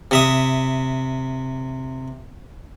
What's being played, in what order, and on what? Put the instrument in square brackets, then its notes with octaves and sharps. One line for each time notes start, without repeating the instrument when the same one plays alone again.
[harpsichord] C3 E5 D#6